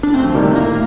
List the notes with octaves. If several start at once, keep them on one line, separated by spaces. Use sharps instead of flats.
D4
D2 C4
F3
C3 D#3 G3 A#3 D#4
A3
A2 A#3